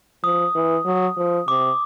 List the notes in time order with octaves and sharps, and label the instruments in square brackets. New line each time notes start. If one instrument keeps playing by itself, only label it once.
[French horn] F3 [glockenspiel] D#6
[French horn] E3
F#3
F3
[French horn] C3 [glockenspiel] D6